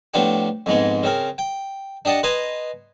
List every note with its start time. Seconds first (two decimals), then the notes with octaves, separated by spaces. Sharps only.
0.14 A2 F3 B3 D4 G4
0.66 F2 G#2 G#3 B3
1.03 C#3 C4 A#4
1.38 G5
2.05 D4 G4 D#5 F#5 A5
2.23 B4 C5 D#5 G#5 A#5